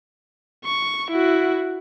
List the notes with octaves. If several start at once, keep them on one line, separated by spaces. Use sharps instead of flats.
C#6
E4 F#4